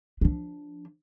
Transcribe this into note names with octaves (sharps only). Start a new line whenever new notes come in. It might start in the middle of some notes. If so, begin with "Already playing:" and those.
F3 D4